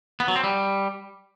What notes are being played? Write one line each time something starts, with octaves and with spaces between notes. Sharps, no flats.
B3
F#3
C4
G3